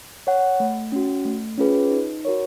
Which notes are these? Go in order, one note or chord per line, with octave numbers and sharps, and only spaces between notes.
C#5 F#5
A3
C#4 F#4
A3
C#4 F4 G#4 B4
D#4
F#4 A#4 C#5